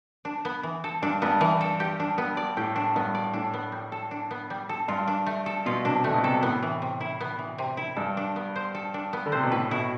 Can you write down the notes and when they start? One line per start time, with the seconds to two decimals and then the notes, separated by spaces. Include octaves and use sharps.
0.25 D4
0.45 B3
0.63 E3
0.84 A4
1.02 G2 D4
1.22 G2 B3
1.41 E3
1.61 A4
1.80 G4
2.00 D4
2.18 B3
2.37 D5
2.57 A2 G4
2.76 D4
2.95 G2 B3
3.15 D5
3.33 A2 D4
3.54 B3
3.72 G3
3.92 A4
4.11 D4
4.31 B3
4.50 G3
4.69 A4
4.88 G2 F4
5.07 D4
5.26 A3
5.46 A4
5.66 B2 F4
5.85 C3 D4
6.04 D3 A3
6.14 B2
6.23 C3 A4
6.43 A2 B3
6.63 E3
6.82 C3
7.00 E4
7.21 B3
7.39 E3
7.58 C3
7.77 E4
7.97 G2 A4
8.17 D4
8.36 B3
8.56 C5
8.75 A4
8.94 D4
9.13 B3
9.26 D3
9.32 C3 C5
9.43 B2
9.51 A2 B4
9.71 B2 E4